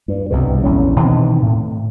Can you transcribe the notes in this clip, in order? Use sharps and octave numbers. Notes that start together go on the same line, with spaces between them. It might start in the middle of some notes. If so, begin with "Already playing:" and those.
G2
C2 G2 B2
A#1 E2 D3 C#4
B2 D#3 E3 C4
A2